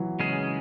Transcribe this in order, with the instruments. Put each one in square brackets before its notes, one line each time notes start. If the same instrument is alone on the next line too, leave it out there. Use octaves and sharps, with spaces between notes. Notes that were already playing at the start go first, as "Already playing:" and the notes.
Already playing: [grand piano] E3 F#3
[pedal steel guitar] C#3 G#3 C#4 G#4